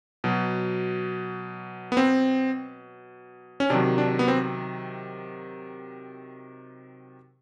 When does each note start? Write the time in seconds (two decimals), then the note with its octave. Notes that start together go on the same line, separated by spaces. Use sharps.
0.24 B2 F#3
1.92 B3
1.97 C4
3.60 C#4
3.70 C3 D#3 F#3 D4
3.98 D4
4.19 B3
4.28 C4